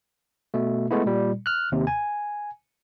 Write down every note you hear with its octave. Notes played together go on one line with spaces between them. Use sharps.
B2 A3
G#3 A3 B3 E4
A#2 G3
F6 F#6
D#2 C3
G#5